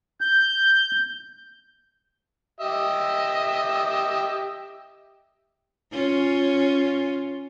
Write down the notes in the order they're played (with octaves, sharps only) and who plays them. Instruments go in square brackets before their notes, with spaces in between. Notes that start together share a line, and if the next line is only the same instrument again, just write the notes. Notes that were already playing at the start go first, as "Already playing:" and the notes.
[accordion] G6
[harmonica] G4 D#5 E5
[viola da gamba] C#4 F4